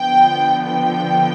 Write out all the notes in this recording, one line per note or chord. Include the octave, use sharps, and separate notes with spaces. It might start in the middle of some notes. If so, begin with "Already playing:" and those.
Already playing: D3 F3 B3 G5
G5